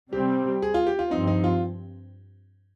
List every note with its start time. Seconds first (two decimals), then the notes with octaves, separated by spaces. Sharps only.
0.13 C3 G3 C4 G4
0.62 G#4
0.74 F4
0.87 G4
0.99 F4
1.11 G2 F3 C4 D#4
1.27 D#4
1.44 F4